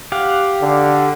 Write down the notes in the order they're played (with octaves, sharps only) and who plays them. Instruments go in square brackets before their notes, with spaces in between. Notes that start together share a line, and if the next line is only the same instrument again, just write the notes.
[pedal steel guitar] G4 F5 F#5
[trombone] D3